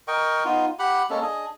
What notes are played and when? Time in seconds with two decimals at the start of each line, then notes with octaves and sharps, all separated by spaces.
0.08 A#4 D#5 G5 C#6
0.45 B3 D#4 F4
0.79 G4 F#5 B5
1.10 G#3 A#3 C#4 A4
1.22 D4 G#4 D#5